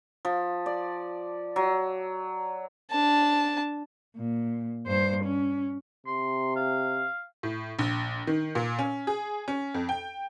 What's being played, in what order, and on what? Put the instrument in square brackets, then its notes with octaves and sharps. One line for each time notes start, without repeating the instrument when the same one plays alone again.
[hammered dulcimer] F3
D5
F#3
[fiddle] D4 A5
[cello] A#2
G2 C5
C#4
[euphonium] C3 [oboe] C6
[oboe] F5
[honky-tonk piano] A2
A#1
D#3
A#2
C#4
G#4
C#4
F2
G5